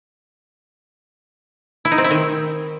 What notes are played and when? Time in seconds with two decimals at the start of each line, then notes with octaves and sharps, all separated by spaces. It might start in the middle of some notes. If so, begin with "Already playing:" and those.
1.85 E4
1.91 D#4
1.98 C4
2.04 E4
2.11 D#3